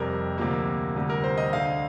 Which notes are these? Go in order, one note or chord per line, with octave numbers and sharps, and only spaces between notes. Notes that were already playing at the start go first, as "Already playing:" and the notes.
Already playing: F2 C3 G3 A#4
D2 C3 F3 A#3
D2 C3 G3
A#4
C5
D#5
D2 D3 A3 F5